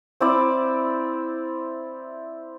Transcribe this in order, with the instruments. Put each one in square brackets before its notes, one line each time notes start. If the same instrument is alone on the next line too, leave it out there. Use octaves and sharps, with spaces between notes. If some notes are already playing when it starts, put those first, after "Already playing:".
[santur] C4 E4 D5